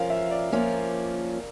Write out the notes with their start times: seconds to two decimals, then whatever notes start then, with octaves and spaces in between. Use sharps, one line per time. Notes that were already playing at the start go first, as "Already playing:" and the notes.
Already playing: F3 C#4 A#4 F5
0.10 E5
0.31 D5
0.52 F3 A#3 C#4